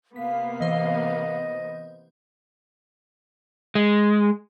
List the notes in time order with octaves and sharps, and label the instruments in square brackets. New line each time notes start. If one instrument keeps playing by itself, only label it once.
[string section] C3 A#3 B3 [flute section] F5 [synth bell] B6
[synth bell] E3 C5 [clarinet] D#5
[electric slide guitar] G#3